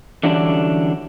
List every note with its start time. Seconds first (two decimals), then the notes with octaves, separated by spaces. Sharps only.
0.23 D3 E3 F#3 G3 C#4 D4